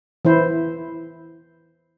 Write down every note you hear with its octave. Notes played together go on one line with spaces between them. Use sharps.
E3 E4 C5